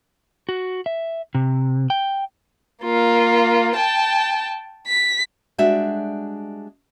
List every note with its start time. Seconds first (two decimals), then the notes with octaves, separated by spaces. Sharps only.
0.49 F#4
0.86 E5
1.35 C3
1.90 G5
2.83 A#3 F4
3.76 G5 A5
4.87 B6
5.58 G3 G#3 D4 F#4 E5